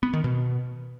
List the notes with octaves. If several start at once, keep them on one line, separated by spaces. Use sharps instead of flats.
B3
D#3
B2